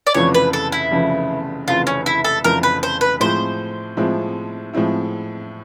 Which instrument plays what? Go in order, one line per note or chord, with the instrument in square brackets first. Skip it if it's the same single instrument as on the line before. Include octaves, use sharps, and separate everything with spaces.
[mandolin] D5
[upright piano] F1 F2 C#3 E3 [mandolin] C#5
[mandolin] B4
A4
E4
[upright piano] F1 F2 C#3 E3
[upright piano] F1 F2 C#3 E3 [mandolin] F4
[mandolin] C#4
E4
A4
[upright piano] F1 F2 C#3 E3 [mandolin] A#4
[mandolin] B4
C5
B4
[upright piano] A2 F3 G#3 C4 E4 [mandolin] C5
[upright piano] A2 F3 G#3 C4 E4
A2 F3 G#3 C4 E4